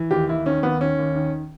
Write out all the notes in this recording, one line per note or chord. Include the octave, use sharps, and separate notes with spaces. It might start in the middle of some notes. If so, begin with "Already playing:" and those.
Already playing: E3
D#2 G4
D#2 E4
D#3 C#4
D#2 B3
D#3 C#4
D#2
D#3